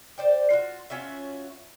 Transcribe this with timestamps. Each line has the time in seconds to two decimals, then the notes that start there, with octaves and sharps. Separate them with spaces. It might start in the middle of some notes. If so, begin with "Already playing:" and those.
0.18 C5 D5 G5
0.50 F4 F#4
0.90 C#4 F4 F#4 E5